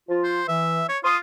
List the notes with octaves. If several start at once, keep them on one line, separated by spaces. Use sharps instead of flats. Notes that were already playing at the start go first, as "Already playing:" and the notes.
F3 F4
C5
E3 E5
C#5
F4 C6 D#6